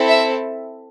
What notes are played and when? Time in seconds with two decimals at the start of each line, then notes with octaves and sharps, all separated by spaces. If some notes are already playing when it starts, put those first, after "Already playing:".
Already playing: C4 E4 A4
0.08 E5